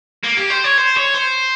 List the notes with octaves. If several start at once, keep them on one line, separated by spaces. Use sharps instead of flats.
A#3
G4
C5
C#5
C5
C#5
C5